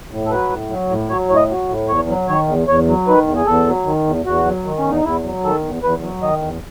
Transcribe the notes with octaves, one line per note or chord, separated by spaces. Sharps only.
A2
A4
F#3 B4
A2
F#3
A2
F#3 C#5
A2 C#5
D#5
F#3
A2
E2 C#5
F#3
D#3 C#5
E2
E2 C#5
F#3
D#3 B4
E2
G#4
E2 A4
F#3
D#3
E2
E2 F#4
F#3
D#3
C#4
E2
D#4
E2 E4
F#3
D#3 A4
E2
E2 B4
F#3
D#3 D#5
E2